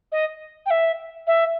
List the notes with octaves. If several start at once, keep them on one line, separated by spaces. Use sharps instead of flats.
D#5
G5
E5
E5